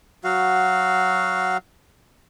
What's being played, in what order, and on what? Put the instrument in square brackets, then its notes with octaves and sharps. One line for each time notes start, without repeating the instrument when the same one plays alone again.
[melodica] F#3 F#4 F5